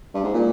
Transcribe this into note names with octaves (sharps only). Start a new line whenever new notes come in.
G2
G#2
A#2